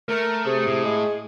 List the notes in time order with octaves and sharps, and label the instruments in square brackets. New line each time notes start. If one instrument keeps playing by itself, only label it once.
[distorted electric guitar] A3 [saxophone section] A#4
[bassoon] C3 [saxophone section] G#4
[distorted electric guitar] A2
[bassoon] G#3